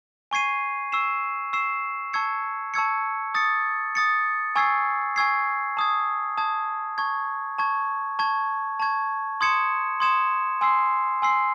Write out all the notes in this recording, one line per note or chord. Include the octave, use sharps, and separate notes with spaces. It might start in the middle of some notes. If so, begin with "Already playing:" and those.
G#5 C#6 G#6 C7 D#7
C#6 E6 C7 E7
C#6 E6 C7 E7
A5 C#6 E6 G#6 C#7
A5 C#6 E6 G#6 C#7
D#6 A6 C#7
D#6 A6 C#7
G#5 C#6 E6 G#6 C7
G#5 C#6 E6 G#6 C7
A5 D#6 G#6
A5 D#6 G#6
A5 C#6 G#6
A5 C#6 G#6
A5 C#6 G#6
A5 C#6 G#6
C6 D#6 G#6 C#7 E7
C6 D#6 G#6 C#7 E7
G#5 C6 E6 C7
G#5 C6 E6 C7